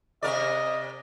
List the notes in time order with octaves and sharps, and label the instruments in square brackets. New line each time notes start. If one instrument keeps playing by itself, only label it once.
[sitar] C3 A#4 D5 [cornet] D#5